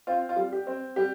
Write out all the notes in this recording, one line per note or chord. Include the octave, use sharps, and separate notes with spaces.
C4 F4
F4
G3
G4
C4
G3 G4